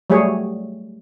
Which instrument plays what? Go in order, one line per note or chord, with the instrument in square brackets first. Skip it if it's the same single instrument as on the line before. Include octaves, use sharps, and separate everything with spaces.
[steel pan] F#3 G3 A3 G#4 C#5